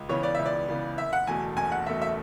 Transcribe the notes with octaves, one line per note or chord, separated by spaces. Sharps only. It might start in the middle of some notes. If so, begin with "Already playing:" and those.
Already playing: C#2
C#3 E3 B3 C#5
D5
C#2 E5
D5
C#3 E3 B3
F#1 E5
F#5
E2 B2 A3 G#5
F#1 G#5
F#5
E2 B2 A3 E5
E5